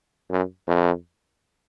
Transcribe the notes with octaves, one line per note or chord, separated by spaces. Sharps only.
F#2
F2